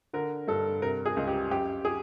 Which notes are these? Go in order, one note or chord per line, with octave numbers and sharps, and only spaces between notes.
D3 A#4
G2 A4
C3 A#4
G#4
C#2
G4
F#2 G4
G#4